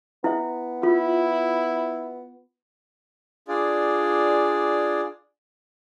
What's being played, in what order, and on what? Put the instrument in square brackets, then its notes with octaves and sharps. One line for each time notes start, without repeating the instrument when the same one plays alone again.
[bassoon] B3 [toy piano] E4 E5
[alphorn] E4 [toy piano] F4
[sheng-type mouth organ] D4 F4 G#4 D5